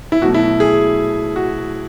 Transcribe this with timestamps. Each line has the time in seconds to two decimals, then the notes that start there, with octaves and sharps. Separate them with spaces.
0.12 E4
0.22 B2 F#3 A3 F#4
0.34 E4
0.60 G#4
1.36 F#4